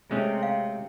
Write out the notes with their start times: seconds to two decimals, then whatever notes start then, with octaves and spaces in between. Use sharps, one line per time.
0.11 C3 G#3 A3 C#4
0.43 F5